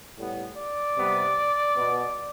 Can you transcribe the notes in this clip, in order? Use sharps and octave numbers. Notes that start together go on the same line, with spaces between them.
A2 G3 B3
D5
C3 G3 B3
B2 B3